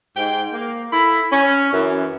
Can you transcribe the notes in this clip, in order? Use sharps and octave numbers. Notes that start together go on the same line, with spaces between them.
G#2 G5
A#3
E4 A4 B5
C#4
F#2 E3